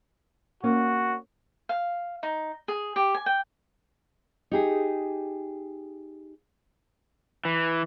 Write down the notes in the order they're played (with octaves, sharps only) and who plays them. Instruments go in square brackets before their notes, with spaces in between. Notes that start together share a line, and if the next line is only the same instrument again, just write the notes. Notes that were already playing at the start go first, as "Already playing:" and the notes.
[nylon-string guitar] A#3 C#4 [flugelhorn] F#4
[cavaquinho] F5
D#4
G#4
G4
G#5
G5
[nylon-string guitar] D#4 G4 G#4
[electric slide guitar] E3